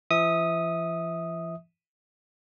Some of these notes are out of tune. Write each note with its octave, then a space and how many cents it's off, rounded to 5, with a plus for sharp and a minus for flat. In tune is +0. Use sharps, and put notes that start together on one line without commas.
E3 +45 E5 -25 D#6 +0